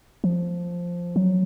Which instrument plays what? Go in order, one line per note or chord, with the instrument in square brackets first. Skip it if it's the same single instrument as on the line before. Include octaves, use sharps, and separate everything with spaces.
[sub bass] F3
F#3